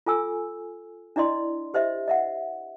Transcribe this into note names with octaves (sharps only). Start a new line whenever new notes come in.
F4 A4 G#5 E6
D4 E4 D5 D#5 C6
G4 C5 D#5 E5
D#5 E5 F#5